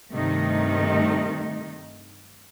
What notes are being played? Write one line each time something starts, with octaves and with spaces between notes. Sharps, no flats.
G2 C3 D#3 A3 D#4